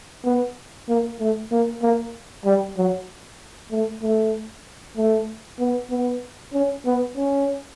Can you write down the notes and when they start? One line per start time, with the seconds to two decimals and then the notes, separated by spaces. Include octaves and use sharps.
0.25 B3
0.88 A#3
1.20 A3
1.52 A#3
1.83 A#3
2.45 G3
2.77 F#3
3.71 A3
4.02 A3
4.97 A3
5.59 B3
5.91 B3
6.53 C#4
6.86 B3
7.17 C#4